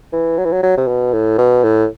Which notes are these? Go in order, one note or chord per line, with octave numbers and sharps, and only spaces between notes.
E3
F#3
E3
F#3
F#3
C3
B2
A2
B2
A2